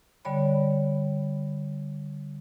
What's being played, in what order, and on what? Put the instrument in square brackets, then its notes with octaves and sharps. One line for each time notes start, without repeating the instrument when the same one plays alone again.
[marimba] D3 G3 C#5 D5 B5